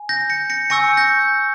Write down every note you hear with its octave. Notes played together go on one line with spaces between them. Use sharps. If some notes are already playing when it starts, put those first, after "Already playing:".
Already playing: G#5
G6 A#6
A#6 C#7
A#6 C#7
G#5 C#6 E6 G6 A#6 C#7
G6 A#6